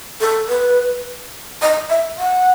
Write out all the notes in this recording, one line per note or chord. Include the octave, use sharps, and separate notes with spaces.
A4
B4
D#5
E5
F#5